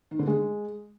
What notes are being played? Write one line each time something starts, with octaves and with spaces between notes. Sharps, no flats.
D#3
D3
G#3